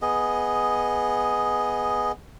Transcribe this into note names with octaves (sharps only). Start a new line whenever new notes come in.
B3 G#4 D#5